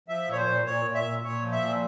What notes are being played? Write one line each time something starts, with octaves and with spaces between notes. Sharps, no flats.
F3 E5
A#2 C#5
C5
A#2
A#2 C#5
A#2
E5
A#2
A#2 C#5
F3
E5
A#2